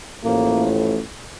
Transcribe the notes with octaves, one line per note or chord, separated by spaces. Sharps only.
A1 A2 F3 A#3